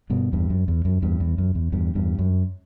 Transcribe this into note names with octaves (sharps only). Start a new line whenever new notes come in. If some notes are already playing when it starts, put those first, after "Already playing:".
G2 B2
E2 G2
F#2
E2
F#2
E2 G2
E2
F#2
E2
E2 G2
E2 G2
F#2